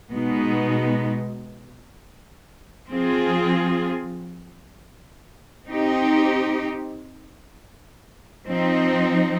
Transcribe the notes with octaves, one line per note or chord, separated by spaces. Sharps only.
B2 G#3 B3 D#4
F3 C4 F4 G#4
C4 D#4 G4
F3 C4 D#4